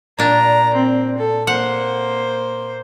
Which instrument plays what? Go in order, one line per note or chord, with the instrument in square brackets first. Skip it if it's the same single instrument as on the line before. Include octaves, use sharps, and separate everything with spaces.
[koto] A#2 D4 [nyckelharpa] A#5
[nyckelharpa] C4
A4
[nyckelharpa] A#3 C5 [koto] F#5